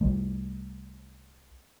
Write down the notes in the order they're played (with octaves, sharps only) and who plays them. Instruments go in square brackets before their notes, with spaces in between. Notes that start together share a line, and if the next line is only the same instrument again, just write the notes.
[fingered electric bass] C2 G3 A3